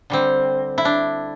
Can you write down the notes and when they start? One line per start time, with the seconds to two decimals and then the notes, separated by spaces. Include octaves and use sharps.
0.10 D3 G3 C4
0.78 E4
0.85 D4